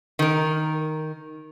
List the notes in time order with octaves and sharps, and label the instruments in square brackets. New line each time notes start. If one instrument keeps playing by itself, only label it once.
[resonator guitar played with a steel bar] D#3 A#4